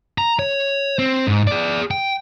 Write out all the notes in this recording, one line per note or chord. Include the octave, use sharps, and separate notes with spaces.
A#5
C#5
C4
G#2
G#4 D5
G5